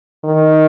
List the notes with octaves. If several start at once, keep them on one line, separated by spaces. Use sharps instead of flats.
D#3